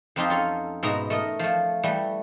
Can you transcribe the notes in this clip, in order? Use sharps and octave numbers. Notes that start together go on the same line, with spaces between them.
F2 F3 C4 D#4 G4 G5
C#4 F4 A4
G#2 B2 G#3 E5 A#5
A3 A#4 D#5
F3 A3
E3 G3 A3